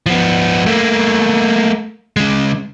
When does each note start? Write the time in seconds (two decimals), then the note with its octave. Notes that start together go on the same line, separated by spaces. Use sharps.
0.06 F3 B3
0.66 A3 A#3
2.17 C#3 G#3